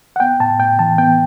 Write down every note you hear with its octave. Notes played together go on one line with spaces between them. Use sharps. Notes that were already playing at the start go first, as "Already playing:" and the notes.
F#5
B3 G5
A2 A5
A2 G5
E3 A5
B3 G5